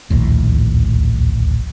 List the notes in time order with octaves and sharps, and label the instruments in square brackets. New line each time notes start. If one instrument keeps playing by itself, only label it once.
[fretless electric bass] D1 A#1 D#2 A2